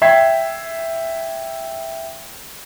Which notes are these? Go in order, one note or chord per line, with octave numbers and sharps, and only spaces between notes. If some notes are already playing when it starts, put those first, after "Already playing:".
E5 G5 G#6 B6 C7